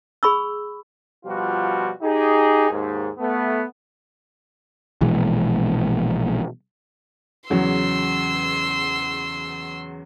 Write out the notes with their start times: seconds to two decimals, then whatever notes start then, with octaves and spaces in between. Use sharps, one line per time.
0.23 G#4 B5 C#6 E6
1.25 B2 F3 G3 F4 F#4
2.02 D#4 G4 G#4
2.69 D#2 G#2
3.18 A3 B3
5.01 A#1 B2 E3 G#3
7.50 E2 C#3 F#3 C6 E6